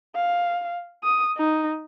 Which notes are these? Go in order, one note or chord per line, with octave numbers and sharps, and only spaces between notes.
F5
D#6
D#4